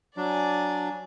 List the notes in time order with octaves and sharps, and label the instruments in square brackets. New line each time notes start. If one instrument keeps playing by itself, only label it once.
[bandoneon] F#3 D4 [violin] D5 G#5